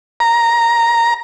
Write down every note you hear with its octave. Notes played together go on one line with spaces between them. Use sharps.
A#5